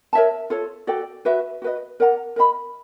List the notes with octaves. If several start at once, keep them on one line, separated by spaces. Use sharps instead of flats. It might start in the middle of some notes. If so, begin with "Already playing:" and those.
A#4 C#5 E5 A5
F4 A4 C#5
F#4 A4 D5 G5
F#4 B4 E5
F#4 B4 D#5
A#4 D5 F#5 A#5
A#4 D#5 G#5 B5